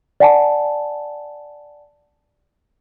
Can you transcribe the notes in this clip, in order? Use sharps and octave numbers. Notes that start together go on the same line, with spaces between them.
D5 F#5 G#5 A5